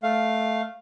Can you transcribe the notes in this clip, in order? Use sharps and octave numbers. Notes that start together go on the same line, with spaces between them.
A3 F5